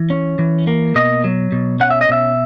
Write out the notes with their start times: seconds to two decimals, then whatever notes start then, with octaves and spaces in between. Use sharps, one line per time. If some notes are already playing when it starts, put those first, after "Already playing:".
Already playing: E3
0.10 C#4
0.39 E3
0.67 A#3
0.95 B2 D#5
1.24 F#3
1.52 B2
1.80 C#4 F#5
1.91 E5
2.01 D#5
2.09 B2 E5